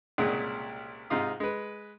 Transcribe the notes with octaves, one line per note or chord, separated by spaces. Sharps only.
C2 A#2 C#3 G#3 F#5 D#6
G#2 C3 D#4 F4 F5 D#6
G#3 B4